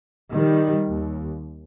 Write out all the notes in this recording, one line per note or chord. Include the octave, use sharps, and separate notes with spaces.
D#3 G3
D#2